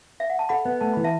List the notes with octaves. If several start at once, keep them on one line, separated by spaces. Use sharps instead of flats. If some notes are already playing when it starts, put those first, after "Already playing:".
E5
F#5
A5
A4 F#5 B5
B3
A3 A5
E3 B5
E5 A5